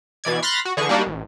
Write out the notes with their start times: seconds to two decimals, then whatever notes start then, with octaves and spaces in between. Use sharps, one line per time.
0.24 B2 E3 D5 G#6
0.42 B5 C6 F6 F#6 A6 A#6
0.65 F#4
0.77 D3 E3 G#4 C#6
0.89 G3 A#3 D4 D#4 F#4
1.06 A1